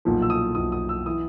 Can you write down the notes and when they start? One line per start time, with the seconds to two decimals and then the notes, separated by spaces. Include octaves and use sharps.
0.05 B1 A#2 F3
0.22 E6
0.30 D#6
0.55 B1 A#2 F3 D#6
0.72 D#6
0.89 E6
1.06 E3 D#6